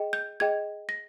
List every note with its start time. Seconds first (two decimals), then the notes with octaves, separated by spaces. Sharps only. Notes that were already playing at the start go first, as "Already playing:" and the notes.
Already playing: G#4 D#5 G5
0.13 G6
0.40 G#4 D#5 G5 G#6
0.89 A#6